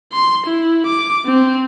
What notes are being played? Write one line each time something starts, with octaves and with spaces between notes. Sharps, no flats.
C6
E4
D6
C4